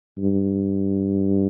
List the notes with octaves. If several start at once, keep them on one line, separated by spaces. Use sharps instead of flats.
G2